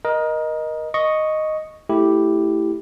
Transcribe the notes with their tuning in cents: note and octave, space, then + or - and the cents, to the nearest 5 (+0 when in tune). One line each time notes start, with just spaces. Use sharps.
A#4 +25 D#5 +0
D#5 +0 C#6 +0
A3 +0 E4 +0 G4 +0